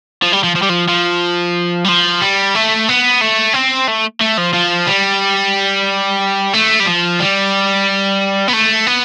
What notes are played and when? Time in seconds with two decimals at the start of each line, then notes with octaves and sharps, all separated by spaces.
0.23 F3
0.33 G3
0.44 F3
0.56 F3
0.62 G3
0.69 F3
0.88 F3
1.84 G3
1.88 F3
2.22 G3
2.55 A3
2.89 B3
3.21 A3
3.54 C4
3.88 A3
4.21 A3
4.38 F3
4.54 F3
4.87 G3
6.54 A3
6.80 G3
6.87 F3
7.20 G3
8.48 B3
8.53 A3
8.87 B3